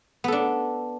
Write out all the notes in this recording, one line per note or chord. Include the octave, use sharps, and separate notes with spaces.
B3 D4 A4